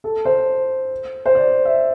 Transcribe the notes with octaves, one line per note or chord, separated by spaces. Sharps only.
A4
C5
C5
D5
E5